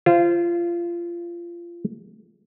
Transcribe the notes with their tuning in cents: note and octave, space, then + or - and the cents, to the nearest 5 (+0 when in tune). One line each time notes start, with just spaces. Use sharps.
F4 -25 C5 +0